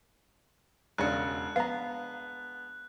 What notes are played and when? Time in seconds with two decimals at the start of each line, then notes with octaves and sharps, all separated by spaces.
0.98 E1 C#3 G#3 D4 F#6 C#7
1.56 B3 F5 A#5